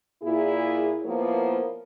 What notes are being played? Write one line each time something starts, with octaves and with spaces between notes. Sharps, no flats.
A#2 E4 G#4
F3 A#3 B3 E4 A#4 C#5